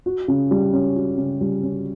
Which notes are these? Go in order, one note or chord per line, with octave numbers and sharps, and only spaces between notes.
F#4
C#3
G3
C#4
F#4
C#3
G3
C#4